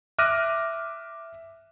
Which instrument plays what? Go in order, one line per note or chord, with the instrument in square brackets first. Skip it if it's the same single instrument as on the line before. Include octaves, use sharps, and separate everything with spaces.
[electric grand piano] E5 D6 F6 F#6 A#6 D#7